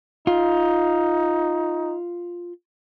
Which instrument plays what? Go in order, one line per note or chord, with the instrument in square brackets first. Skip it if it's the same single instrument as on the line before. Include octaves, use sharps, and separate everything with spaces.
[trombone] D#4 [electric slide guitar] F4